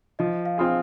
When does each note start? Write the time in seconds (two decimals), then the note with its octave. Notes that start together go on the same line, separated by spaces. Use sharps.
0.19 F3 D#5
0.45 F5
0.58 C4 F4 G#4